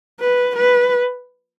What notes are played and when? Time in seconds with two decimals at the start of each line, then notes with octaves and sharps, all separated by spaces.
0.20 B4
0.56 B4